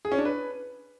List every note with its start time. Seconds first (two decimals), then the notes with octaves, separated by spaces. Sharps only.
0.05 G#4
0.12 C#4
0.18 D4
0.25 B4